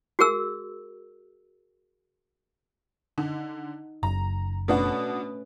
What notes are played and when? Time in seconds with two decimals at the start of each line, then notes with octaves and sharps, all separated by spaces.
0.19 F#4 G#4 A#4 E6
3.18 D3 D#4
4.03 F#1 A#5
4.68 B2 A3 C#4 D4 F#4 B4